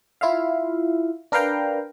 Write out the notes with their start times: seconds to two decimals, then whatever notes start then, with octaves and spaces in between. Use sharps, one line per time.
0.21 E4 F4 E5 F5
1.32 D4 A#4 B4 F5 G5 A#5